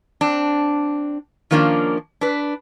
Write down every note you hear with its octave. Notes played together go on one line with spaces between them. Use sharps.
C4 D4
D#3 F3 A#3 C#4 D4
D4 B4